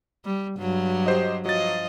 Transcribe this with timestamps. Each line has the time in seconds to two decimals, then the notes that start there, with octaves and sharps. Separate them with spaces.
0.25 G3
0.58 G2 F#3
1.06 G4 C5 D#5
1.46 F3 F#3 D#5 A6